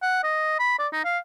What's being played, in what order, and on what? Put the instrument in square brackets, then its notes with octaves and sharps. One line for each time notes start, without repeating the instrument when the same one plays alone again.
[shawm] F#5
D#5
B5
D5
D#4
F5